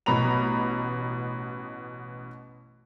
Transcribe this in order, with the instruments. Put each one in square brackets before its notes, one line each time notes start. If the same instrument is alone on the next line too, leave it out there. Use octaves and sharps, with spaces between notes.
[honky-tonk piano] A1 B2 A#5 B5 F7